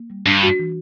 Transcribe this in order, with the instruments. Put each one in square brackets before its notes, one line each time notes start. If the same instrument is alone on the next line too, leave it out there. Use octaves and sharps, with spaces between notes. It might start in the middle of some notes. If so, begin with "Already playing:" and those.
Already playing: [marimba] A#3
G3
[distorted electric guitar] G2 [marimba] D4
[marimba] F#4
E3